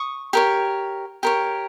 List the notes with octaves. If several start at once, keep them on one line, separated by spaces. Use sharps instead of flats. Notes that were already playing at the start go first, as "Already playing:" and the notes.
Already playing: C#6 D#6
G4 A#4 C#5
G4 A#4 C#5